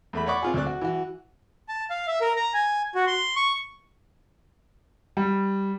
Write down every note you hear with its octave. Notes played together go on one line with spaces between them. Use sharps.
E2 A3 B5
C#5 D5 F#5 B5 C#6 D6
C4 F4 G#4
D2 C4 D5 F#6
F#4
E3 F#4
A5
F5
E5
A#4
A#5
G#5
F#4
C6
C#6
G3